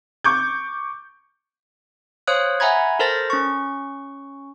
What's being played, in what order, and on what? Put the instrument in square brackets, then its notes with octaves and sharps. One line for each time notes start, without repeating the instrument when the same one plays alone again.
[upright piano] C#6 D6 G6
[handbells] C5 C#5 F5 D#6 F#6
E5 F#5 G#5 A#5 B5 G#6
A4 A#4 C5 A5 A6 A#6
C#4 C#6